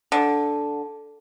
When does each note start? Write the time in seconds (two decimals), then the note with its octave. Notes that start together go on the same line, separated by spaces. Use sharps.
0.12 D3